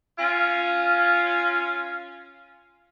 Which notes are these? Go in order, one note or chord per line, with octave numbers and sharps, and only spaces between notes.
C#4 F4